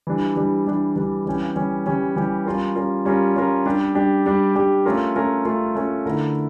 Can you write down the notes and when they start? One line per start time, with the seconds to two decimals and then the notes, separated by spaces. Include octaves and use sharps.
0.07 E3 G3 D4
0.36 E3 G3 D4
0.67 E3 G3 D4
0.96 E3 G3 D4
1.26 E3 G3 C#4 G4
1.56 E3 G3 C#4 G4
1.86 E3 G3 C#4 G4
2.16 E3 G3 C#4 G4
2.46 G3 C#4 F4 A#4
2.75 G3 C#4 F4 A#4
3.05 G3 C#4 F4 A#4
3.36 G3 C#4 F4 A#4
3.66 G3 D4 G4
3.95 G3 D4 G4
4.26 G3 D4 G4
4.55 G3 D4 G4
4.85 A3 C#4 F4 A#4
5.16 A3 C#4 F4 A#4
5.45 A3 C#4 F4 A#4
5.75 A3 C#4 F4 A#4
6.06 D3 A3 E4 A#4